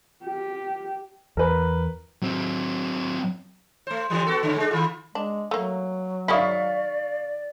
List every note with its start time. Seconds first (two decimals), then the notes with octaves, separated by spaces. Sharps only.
0.25 G4
1.37 E2 A#4 B4
2.23 F#3 C4
3.87 A3 C5
4.10 D3 E3 G3
4.26 B3 F#4 A4
4.43 A2 C#3
4.56 G#3 D4
4.71 D#3 F4
5.15 G#3 D4
5.51 F#3 A3 A#3
6.28 D#3 G#3 E4 D5 F5 C#6 B6